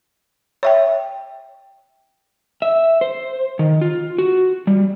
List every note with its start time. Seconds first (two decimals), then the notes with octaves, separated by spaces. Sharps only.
0.63 C#5 E5 G5
2.62 E5
3.01 C5
3.59 D#3
3.81 F4
4.18 F#4
4.67 G3